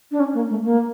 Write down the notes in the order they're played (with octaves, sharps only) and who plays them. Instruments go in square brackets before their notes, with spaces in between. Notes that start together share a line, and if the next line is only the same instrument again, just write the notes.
[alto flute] D4
C#4
A#3
A3
A#3